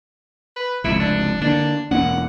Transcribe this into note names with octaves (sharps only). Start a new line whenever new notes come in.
B4
F1 C#2 C3 E4
D4
D3 A#3 D4
E1 A#3 C#4 F#5